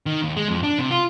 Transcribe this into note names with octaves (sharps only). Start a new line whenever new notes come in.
D#3
D#2
G#3
F2
D4
C3
F4